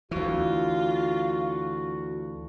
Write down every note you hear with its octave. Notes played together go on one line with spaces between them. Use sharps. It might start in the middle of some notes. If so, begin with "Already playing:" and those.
D2 E3 F4 F#4